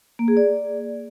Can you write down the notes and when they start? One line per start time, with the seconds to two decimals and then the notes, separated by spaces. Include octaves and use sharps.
0.19 A#3
0.28 G#4
0.37 D5